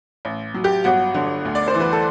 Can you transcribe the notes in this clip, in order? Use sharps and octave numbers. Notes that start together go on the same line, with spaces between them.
A1
F#3
G4
G1 F#4
D3
D2
D5
C5
E3
B4
A4